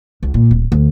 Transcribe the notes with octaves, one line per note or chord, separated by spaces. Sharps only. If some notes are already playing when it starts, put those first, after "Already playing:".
C#2
A#2
D1
D2